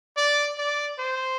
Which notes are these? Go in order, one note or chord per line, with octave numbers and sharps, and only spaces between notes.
D5
D5
C5